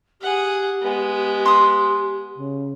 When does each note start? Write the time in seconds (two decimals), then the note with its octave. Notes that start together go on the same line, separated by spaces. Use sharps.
0.21 G4 G#4 F#5
0.81 G#3 B3
1.46 C6 D#6
2.36 C#3